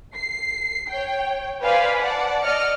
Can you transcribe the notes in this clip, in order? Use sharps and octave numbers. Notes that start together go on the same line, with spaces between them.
C7
C#5 G5
B4 C5 D5 F5 G#5 B5
D5 F#5 A5
D5 D#5 F6 C#7